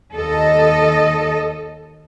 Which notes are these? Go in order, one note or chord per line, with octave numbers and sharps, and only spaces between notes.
D#2 A4 D#5